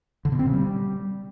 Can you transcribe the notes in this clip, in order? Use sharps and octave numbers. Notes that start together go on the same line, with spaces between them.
D3
B2
C4
C#3
G3